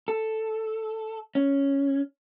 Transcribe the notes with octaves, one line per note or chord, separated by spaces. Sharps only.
A4
C#4